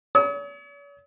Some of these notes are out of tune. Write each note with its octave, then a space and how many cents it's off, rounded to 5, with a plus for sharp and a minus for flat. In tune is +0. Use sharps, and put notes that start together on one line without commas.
C#5 +45 D#6 +45